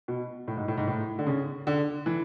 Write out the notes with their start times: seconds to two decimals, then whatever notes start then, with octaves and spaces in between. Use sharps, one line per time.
0.08 B2
0.48 A2
0.57 G#2
0.68 A2
0.77 G#2
0.87 A2
1.19 D3
1.26 C#3
1.67 D3
2.06 E3